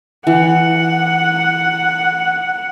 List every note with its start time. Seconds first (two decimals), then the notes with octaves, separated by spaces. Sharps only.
0.27 E3 F#5